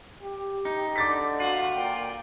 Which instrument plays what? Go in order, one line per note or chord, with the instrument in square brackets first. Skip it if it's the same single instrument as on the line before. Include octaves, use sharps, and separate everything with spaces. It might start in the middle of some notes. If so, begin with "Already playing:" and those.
[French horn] G4
[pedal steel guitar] D#4
[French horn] D3 [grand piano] D6 A6 B6
[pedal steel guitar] F4 [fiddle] F#4 F#6
[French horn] A#2 [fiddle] A#4 G5